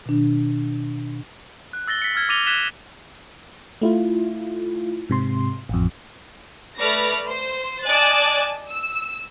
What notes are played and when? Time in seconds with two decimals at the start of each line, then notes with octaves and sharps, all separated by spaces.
0.06 B2 D#3 D4
1.73 F#6
1.88 E6 A6 A#6 G7
2.02 B6 C#7
2.15 E6 F6 G#6
2.29 D6 A6 A#6 D#7 F7 G7
2.46 F#6 G#6 B6 E7 G7
3.82 A3 E4 F4
5.09 G#2 C3 C6
5.69 A1 F2
6.77 A3 B4 D5 F6 A#6
7.26 C5
7.85 D5 D#5 G#5 A5 F#6 A6
8.67 E6